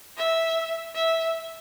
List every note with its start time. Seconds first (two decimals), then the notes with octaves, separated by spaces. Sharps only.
0.18 E5
0.95 E5